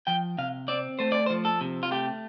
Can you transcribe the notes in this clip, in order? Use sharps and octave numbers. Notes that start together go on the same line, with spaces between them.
F3 G5
C3 F5
C4 D5
A3 C5
D5
C5
F3
A4
C3
F4
A3 G4